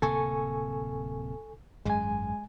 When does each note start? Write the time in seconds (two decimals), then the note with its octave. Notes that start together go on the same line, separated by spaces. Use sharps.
0.02 D1 C3 A#3 A4 G#5 C#6
1.85 G#1 F#2 G#3 G#5